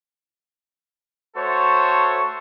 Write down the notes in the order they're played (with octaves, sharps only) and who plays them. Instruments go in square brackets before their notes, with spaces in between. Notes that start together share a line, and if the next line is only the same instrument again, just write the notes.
[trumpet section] A3 F#4 A4 C5 C#5 C#6